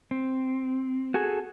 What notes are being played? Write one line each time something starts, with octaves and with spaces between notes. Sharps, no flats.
C4
F#4 G#4 A4 G#5